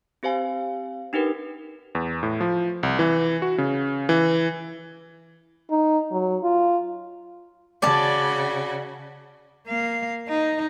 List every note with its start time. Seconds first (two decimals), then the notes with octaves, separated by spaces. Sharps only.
0.23 C4 G4 C5 F5 G#5
1.13 D4 D#4 G4 A#4 B4
1.95 E2
2.23 A2
2.41 F3
2.83 C2
2.99 E3
3.42 F#4
3.58 C#3
4.09 E3
5.71 D#4
6.11 F#3
6.43 F4
7.82 C#3 F#4 D5 A5
9.67 A#3 F5
10.28 D#4